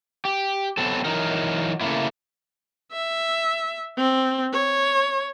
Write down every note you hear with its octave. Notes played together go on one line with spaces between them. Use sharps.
G4
F#3 B3 C4 A4
E3 F#3 D#4 A#4
C#3 A3 A#3 E4
E5
C4
C#5